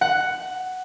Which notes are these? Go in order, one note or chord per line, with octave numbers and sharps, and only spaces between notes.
F#5